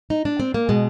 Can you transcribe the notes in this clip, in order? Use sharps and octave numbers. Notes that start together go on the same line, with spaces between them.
D#4
D4
C4
A#3
B2 G#3